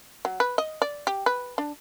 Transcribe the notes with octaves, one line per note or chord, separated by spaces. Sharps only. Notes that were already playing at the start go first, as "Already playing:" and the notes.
F#3
B4
D#5
D5
G4
B4
D4